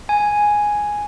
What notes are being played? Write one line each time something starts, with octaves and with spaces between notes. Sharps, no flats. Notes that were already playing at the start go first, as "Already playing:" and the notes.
G#5